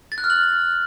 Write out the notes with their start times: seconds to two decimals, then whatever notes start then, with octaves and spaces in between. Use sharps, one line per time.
0.12 A6
0.18 F#6
0.24 F6
0.30 F#7